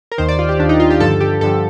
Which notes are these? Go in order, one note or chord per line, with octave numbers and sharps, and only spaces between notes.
A#4
D#2 D#3 C5
D5
F4
G4
D#2 D#3 D4
D#4
F4
G4
G2 D3 F3 A4
G4
G2 D3 F3 A4